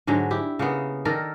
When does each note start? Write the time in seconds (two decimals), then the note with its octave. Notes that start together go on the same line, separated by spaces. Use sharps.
0.07 G#2 D3 F#3 G#3
0.31 E4 G4
0.59 C#3 A#3 B3
1.05 D#3 A4 A#4 D5